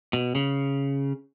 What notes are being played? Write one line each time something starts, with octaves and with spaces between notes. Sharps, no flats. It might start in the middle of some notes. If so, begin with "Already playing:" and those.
B2
C#3